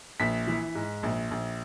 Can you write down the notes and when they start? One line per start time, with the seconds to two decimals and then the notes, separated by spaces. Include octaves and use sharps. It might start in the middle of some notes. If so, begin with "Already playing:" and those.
0.20 A#1 B6
0.47 E3
0.75 G#2
1.03 A#1
1.31 A#1